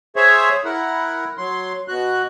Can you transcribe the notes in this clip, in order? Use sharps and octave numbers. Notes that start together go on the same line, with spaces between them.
G#4 C5 C#5 E5
E4 A#4 F#5
F#3 C6
B2 F#4 F#6